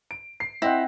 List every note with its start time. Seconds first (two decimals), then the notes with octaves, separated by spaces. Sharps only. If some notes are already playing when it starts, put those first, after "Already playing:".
0.11 D7
0.40 C7
0.62 C4 E4 D#5 F#5 A#6